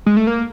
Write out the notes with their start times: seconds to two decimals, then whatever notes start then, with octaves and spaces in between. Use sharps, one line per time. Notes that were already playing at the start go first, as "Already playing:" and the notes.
0.06 G#3
0.17 A3
0.27 A#3